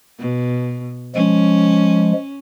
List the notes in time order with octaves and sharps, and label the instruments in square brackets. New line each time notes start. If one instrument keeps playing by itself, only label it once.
[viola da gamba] B2
[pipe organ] F3 G#3 [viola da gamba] C#4